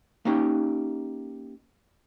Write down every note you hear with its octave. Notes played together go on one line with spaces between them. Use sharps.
A#3 C#4 D#4 G4